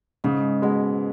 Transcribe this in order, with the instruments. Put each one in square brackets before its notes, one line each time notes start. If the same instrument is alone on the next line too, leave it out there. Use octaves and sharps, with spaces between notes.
[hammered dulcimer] G#2 [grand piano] C#3
[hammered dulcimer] B2 [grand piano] G#3